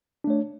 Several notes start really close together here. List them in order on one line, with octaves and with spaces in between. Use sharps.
D4 A3 C#5